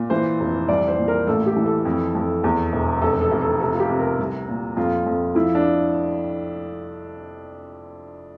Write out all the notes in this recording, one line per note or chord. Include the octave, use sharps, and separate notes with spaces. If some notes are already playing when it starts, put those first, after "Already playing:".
Already playing: A#2
E3 C5
F1
C2 D5
C5
A#2
A#4
A1 A4
G4
E3
A4
F2
F2
E2
E1
F1 A4
A4
F1
A4
C3 A4
F4
G4
C3
A#4
C2
A#2
F2 F4
F2
F3 E4
D4